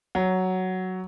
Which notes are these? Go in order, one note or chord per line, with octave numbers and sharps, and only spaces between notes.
F#3